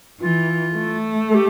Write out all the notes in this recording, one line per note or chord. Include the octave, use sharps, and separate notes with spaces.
E3 F4
A3
A4
G4